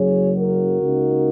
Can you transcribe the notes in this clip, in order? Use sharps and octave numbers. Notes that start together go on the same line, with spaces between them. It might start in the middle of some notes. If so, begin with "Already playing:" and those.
Already playing: F#1 F#2 C#3 F#3 G#4 C#5
F#4 A#4
C#2 C#3 A#3 D#4